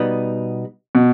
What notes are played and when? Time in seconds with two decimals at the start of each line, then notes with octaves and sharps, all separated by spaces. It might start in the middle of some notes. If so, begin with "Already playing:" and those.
Already playing: B2 G3 B3 D#4
0.95 B2